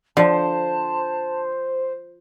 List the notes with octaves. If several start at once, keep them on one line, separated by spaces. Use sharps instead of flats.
D3 F3 C5 A5